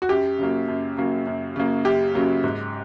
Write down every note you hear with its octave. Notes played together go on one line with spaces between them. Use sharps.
F#4
F#2 G4
C#3 F#3 A#3
F#2
C#3 F#3 A#3
F#2
C#3 F#3 A#3
F#2 G4
C#3 F#3 A#3
G#2